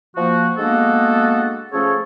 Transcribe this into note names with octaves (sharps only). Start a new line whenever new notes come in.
F3 A#3 F#4
G#3 A#3 B3 D4 F#4 A4
F3 A3 C#4 G#4 A4 C#5